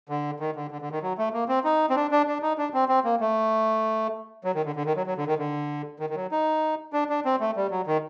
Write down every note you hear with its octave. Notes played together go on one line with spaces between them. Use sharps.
D3
D#3
D3
D3
D3
D#3
F#3
A3
A#3
C4
D#4
C4
D4
D4
D4
D#4
D4
C4
C4
A#3
A3
F#3
D#3
D3
D3
D#3
F#3
F#3
D3
D#3
D3
D#3
D#3
F#3
D#4
D4
D4
C4
A3
G3
F#3
D#3